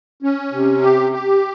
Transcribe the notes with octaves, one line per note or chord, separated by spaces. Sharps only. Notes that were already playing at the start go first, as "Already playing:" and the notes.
C#4
C3
G4
G4